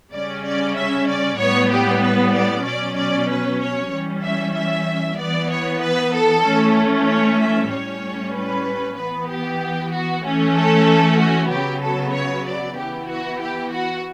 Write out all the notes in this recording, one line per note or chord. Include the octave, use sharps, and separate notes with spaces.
C#3 G3 C#4 D5
D5
E5
D5
A2 G3 B3 C#5
G4
B4
D5
B2 F#3 C#4 D5
D5
B4
C#5
E3 G3 C#4
E5
E5
E3 B3 D5
C#5
B4
A4
E3 A3 C#4
C#5
E5
A2 G3 C#4 C#5
B4
E3 B3 B4
G4
F#4
E3 A3 C#4
A4
F#4
C#3 F#3 B3 G4
A4
C#5
D5
E3 B3 G4
F#4
G4
F#4